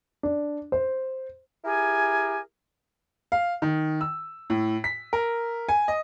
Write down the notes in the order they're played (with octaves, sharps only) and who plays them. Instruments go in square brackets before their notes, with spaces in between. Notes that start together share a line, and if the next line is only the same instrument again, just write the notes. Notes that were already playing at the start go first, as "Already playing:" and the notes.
[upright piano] D4
C5
[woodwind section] E4 G4 G#4 A#4 G#5
[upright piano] F5
D#3
E6
A2
B6
A#4
G#5
D#5